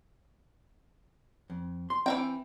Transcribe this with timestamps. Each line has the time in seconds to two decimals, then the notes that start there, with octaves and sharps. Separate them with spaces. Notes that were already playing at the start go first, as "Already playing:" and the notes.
1.50 F2
1.90 C6
2.06 E3 F#3 C4 G5